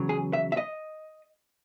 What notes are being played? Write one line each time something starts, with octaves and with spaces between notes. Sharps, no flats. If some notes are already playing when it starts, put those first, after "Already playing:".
Already playing: E2 C#3 F#3
G#4
E5
E5
D#5